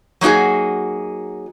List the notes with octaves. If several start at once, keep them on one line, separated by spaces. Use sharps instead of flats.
F#3 A#3 D#4 F#4 G#4